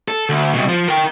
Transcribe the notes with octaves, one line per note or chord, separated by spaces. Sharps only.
A4
D2
C2 B2
F3
A#4 G5